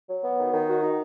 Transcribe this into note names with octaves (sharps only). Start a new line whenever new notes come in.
F#3
B3
D#3
D#3
F#4
D#4